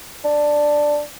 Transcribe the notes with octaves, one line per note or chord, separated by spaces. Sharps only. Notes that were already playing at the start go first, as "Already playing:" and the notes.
D4